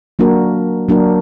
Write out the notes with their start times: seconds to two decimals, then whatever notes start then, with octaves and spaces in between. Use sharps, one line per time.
0.19 F#3 A#3 D4 F#4 A#4
0.88 F#3 A#3 D4 F#4 A#4